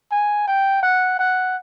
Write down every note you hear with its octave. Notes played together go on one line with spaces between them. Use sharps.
G#5
G5
F#5
F#5